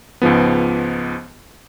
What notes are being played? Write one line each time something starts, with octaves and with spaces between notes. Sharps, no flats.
C#2 G#2 F3 B3